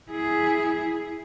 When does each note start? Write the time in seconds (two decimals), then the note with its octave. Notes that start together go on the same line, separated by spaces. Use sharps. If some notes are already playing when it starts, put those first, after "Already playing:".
0.11 E4 G#4